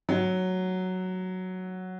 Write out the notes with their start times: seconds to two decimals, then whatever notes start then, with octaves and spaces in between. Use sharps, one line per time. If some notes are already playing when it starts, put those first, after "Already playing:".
0.09 F#3